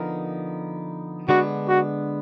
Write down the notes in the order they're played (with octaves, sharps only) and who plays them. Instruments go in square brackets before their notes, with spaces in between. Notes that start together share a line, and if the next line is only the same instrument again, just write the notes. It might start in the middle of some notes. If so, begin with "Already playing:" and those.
Already playing: [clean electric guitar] D3 F3 B3 D#4 A#4
[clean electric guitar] D3 G#3 B3 D4 [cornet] F#4
[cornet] F#4